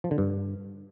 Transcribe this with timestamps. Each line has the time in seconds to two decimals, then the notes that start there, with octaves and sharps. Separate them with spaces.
0.04 F3
0.11 D3
0.18 G2